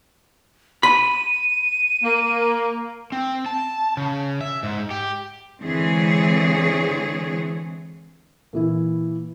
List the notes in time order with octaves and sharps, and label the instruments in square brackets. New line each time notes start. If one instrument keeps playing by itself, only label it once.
[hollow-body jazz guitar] B5 [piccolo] D#7
[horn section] A#3
[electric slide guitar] C4
A5
C#3
E5
G#2
G4
[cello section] D3 E3 G#3 C4 G#4 C#5
[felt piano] A#2 E3 E4